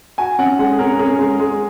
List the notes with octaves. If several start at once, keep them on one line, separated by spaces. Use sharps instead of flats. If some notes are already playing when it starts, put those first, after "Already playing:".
F#4 G#5
C#4 F#5
G#3 F#5
G#4
C#4 A#4
C#4 G#4
G#3
G#3